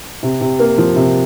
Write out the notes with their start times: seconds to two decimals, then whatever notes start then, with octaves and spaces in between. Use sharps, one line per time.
0.23 C3
0.41 C3
0.59 A#3
0.78 F3
0.96 C3